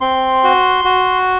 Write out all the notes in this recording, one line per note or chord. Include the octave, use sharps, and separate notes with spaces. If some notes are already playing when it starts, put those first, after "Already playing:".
C4 C6
F#4
F#4